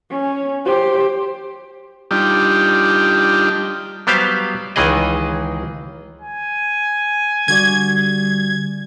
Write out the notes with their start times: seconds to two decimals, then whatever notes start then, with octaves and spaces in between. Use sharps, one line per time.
0.11 C#4
0.65 G4 C5
2.11 G3 D4 D#4 F4 G4
4.07 F#3 G3 B3 G4 C5 F5
4.76 C#2 D#3 E3 G#4 D#5
6.21 G#5
7.48 D3 G3 F#4 D5 G#6